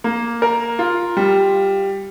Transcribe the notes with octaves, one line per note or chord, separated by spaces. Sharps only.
A#3
A#4
F4
G3